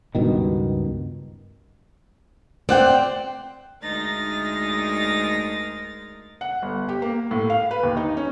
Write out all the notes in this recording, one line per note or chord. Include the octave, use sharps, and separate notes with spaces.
C#2 G2 B2 D#3
C4 D5 F#5 G5
D2 G#3 D#4 A#4 A6 A#6
F#5
G1
G4
A#3
A2
F5
B4
D#2
D#4
C#4